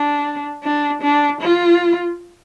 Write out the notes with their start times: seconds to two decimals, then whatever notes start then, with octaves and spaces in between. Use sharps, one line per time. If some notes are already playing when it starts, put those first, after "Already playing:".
Already playing: D4
0.63 D4
1.02 D4
1.42 F4